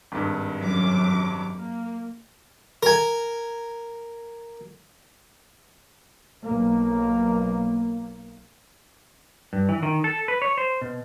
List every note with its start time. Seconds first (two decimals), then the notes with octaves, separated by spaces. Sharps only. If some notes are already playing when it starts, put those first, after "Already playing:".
0.12 G#1 G2
0.59 F#2 D6
1.56 A#3
2.83 A#4 G#5
6.44 B1 A#3
9.53 G2
9.69 E3
9.83 D#3
10.04 A4
10.28 B4
10.42 C#5
10.58 C5
10.82 B2